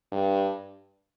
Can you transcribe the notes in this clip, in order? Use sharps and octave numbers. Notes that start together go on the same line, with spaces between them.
G2